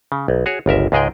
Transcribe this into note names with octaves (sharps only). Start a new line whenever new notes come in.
C#3
B1
F#4 G#4 C#5
G1 C#2 A#4 E5
C#2 G#2 G#3 G#4 D#5 G5